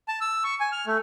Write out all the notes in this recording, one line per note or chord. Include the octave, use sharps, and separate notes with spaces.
A5
E6
C#6
G#5
F6
A3